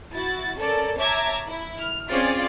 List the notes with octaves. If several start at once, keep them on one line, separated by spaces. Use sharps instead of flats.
E4 F#4 A6
C#4 A4 A#4 D5 A5
C#5 E5 A5 A#5 D6 G#6
E4
F6
C4 C#4 F4 G#4 C5 D5